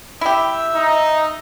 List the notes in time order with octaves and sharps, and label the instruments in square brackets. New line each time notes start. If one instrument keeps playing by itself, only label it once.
[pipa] E4 G4 [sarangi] E5
[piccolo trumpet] D#4